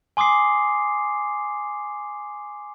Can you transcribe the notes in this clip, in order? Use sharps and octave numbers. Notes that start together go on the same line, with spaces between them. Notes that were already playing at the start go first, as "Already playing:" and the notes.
G#5 C6 D6 D#6 C7